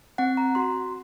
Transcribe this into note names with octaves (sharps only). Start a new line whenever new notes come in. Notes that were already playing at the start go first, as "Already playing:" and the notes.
C4 F#5
A#5
F#4 C6